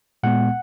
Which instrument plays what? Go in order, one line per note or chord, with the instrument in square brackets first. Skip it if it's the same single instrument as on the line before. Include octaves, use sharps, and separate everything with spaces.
[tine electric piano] A#2 G#3 B3 F#5